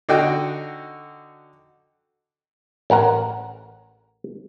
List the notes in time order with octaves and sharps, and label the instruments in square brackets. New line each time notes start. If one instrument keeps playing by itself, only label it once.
[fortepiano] D3 D#4 F#4 G5
[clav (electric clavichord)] A1 A#4 F#5 A#5